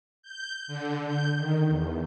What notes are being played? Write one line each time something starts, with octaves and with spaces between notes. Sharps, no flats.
G6
D3
G6
D#3
E2